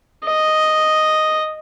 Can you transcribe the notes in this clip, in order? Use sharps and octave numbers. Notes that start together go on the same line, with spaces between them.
D#5